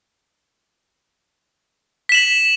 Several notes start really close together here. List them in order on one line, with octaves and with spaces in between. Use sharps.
B6 E7 F#7